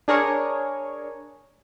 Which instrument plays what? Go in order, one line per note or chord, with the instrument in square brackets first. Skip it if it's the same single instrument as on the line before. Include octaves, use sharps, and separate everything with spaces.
[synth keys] D4 G#4 A#4 C#5